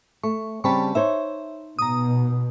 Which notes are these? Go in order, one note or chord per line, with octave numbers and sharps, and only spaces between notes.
A3 C#6
C#3 G3 C4 A5 B5 C#6
D#4 C5 C#5 E5
B2 A#5 D#6